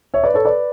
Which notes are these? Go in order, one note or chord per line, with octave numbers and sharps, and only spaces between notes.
C#5 E5
B4 D5
A4 C#5
B4 D5